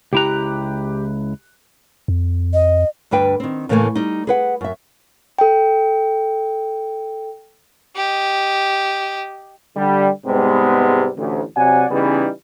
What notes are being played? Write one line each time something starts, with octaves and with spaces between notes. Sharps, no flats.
C#2 E4 G4 A#5 F#6
F2
D#5
D2 G2 D4 B4 G5
D#3 C4
A2 C#3 E3 A3 A#3 G#5
G3 D#4
G#4 B4 F#5
F#2 E5
A4 G5
G4 D#5
D3 G3
G#2 C3 G3 G#3 B3
A1 D2
C3 F#3 D5 F#5 G#5
C#3 E3 G3 B3 C#4 D#4